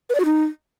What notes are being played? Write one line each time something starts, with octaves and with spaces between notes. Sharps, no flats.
B4
D5
F#4
D#4